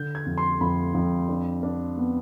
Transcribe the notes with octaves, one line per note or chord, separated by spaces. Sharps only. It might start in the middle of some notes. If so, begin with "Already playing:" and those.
Already playing: D3 G6
G#6
F2
C6
F2 B5
F2
D4
D4
B3